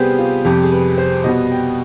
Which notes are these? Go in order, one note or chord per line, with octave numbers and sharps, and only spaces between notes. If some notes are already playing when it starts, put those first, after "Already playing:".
Already playing: C3 G3 B3 G4 G#4 B4 C5
F4
F2 C3 G3 G4
G#4
B4
C5
B2 G3 B3 D#5
G5